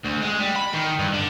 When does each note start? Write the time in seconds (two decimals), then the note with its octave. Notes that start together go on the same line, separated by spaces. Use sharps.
0.05 D2
0.22 G#3
0.40 G3
0.56 B5
0.74 D#3
0.99 G2
1.13 D3